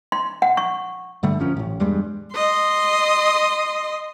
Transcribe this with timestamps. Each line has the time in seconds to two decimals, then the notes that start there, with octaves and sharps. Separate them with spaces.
0.12 C6
0.42 F#5
0.57 C#6
1.23 G2 D3 G3 A3
1.39 G#1 F#2 F3 C#4
1.57 A1 A2
1.80 E2 G2 G3 G#3
2.35 D#5 C6